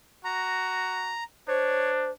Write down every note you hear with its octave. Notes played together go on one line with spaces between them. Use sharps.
F#4 A#5
D4 C5 C#5